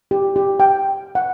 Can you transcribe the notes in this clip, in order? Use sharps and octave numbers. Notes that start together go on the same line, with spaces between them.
G4
G4
G5
F#5